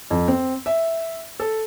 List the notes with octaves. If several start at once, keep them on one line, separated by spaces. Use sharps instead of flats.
F2
C4
E5
A4